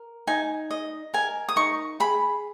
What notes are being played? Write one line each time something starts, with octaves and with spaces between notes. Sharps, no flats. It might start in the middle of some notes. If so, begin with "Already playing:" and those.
Already playing: A#4
D#4 G#5
D#5
A#4 G#5
D#6
D#4 C#6
G#4 B5